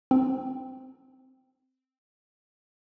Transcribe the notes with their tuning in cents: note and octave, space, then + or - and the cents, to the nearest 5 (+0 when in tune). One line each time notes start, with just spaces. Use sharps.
C4 -5